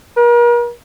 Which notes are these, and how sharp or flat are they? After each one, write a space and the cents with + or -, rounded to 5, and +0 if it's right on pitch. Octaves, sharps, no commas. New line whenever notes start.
A#4 +40